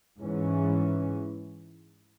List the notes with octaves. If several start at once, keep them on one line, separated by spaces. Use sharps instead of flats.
G#2 E3 C#4